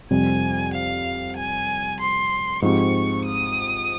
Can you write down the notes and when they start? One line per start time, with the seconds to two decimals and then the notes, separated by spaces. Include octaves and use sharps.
0.10 F2 C3 G3 G#5
0.73 F5
1.36 G#5
2.00 C6
2.62 G#2 F3 C4 G4 C#6
3.26 D#6